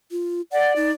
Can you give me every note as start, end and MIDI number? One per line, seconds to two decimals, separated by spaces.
0.11 0.41 65
0.52 0.91 74
0.52 0.73 78
0.76 0.92 63